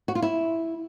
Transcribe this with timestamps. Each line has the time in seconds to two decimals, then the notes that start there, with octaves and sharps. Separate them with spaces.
0.08 F#4
0.15 F4
0.22 E4